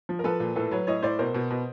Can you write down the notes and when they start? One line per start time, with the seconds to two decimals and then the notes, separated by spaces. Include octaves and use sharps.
0.09 F3
0.19 A#4
0.24 F3 A4 B4
0.40 A#2
0.55 A2 A4 B4
0.71 F#3 B4 C#5
0.87 A2 C#5 D#5
1.03 A2 C5 D5
1.19 B2 A#4 C5
1.34 B2
1.50 B2